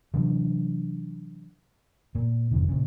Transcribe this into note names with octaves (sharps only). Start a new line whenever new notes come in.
C3 E3 F#3 D4
A#2 A#3
G#1 F2 C3 D#3
A#2 C#3